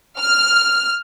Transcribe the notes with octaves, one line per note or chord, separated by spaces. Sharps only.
F6